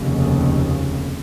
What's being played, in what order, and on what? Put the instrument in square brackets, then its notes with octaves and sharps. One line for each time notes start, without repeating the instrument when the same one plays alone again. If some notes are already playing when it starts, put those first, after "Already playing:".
Already playing: [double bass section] F1 D#2 C#3